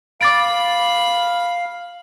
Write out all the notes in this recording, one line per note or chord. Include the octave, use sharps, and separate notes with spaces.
F5 B5 D6 A6 D7